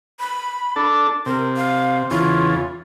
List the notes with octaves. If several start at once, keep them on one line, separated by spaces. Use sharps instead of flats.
B5
D4 A4
C3 A#4
F5
E2 C#3 F4